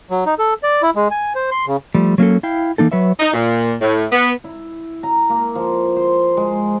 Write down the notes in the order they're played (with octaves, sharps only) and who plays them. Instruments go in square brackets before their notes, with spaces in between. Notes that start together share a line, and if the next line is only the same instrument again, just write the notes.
[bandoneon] F#3
D#4
A4
D5
E4
G#3
G#5
C5
C6
C#3
[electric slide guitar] F3 G3 A3
F#3 A#3 C#4 A4
E4 F5 G5
E3 A#3 D#4 A4
F#3 B4 C#5 E5
[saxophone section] D#4
A#2
A2
B3
[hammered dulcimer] E4
A#5
A#3
F3
C5
G#3